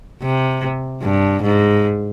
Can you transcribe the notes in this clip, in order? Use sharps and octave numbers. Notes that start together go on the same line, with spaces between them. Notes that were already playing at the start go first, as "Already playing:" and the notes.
C3
G2
G#2